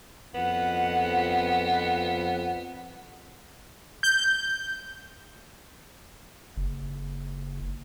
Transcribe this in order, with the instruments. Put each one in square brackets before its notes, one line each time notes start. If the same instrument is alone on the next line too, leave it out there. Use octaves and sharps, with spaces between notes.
[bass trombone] F2 [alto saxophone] B3 [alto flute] F#5
[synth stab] G6
[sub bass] F#1